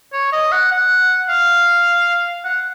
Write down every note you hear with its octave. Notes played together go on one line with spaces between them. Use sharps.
C#5
D#5
F#5
F#5
F5
F#5